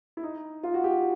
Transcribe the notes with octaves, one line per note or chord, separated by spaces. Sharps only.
E4
D#4
F4
F#4
G4